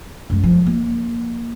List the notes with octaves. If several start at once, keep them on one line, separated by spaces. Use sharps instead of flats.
F#2 G#3
F3
A#3